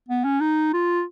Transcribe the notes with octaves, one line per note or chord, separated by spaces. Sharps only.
B3
C#4
D#4
F4